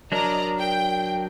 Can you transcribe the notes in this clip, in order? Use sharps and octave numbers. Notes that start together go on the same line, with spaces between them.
F#3 D4 A#4 D5 D#5 A#5
G5